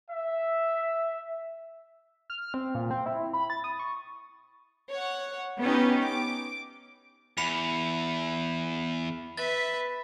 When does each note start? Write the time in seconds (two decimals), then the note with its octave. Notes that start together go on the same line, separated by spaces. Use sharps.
0.10 E5
2.30 F6
2.54 C4
2.75 A#2
2.91 C4
3.06 E4
3.33 B5
3.50 A6
3.64 D#6
3.79 C#6
4.90 C#5 F#5
5.60 B3 C#4 D#4 G4 B4
6.05 D6
7.38 E2 B5 C#7 F7
9.37 B4 E5 A6